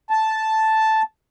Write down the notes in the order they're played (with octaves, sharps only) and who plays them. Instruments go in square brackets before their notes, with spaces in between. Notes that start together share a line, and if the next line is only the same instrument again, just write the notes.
[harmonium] A5